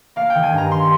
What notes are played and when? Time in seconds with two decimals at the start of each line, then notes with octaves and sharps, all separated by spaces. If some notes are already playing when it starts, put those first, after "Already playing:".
0.16 A#3 F5
0.30 D#3 G5
0.43 G#5
0.53 G2
0.58 A#5
0.71 G3 C6